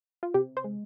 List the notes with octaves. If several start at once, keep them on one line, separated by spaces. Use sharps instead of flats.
F4
C3 G4
C5
G#3